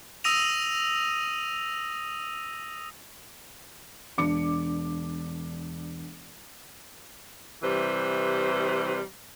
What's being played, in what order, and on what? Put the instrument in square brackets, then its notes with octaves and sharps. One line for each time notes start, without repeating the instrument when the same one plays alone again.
[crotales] D#6 E6 A#6 D#7 F7
[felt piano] E1 D4 D6 C#7
[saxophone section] C3 E3 G3 B4 C5